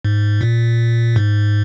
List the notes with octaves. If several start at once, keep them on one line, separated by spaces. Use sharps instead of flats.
G#2
A#2
G#2